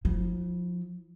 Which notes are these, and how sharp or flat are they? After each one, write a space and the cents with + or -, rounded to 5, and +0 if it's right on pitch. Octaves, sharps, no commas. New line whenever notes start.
F3 +20 E4 -30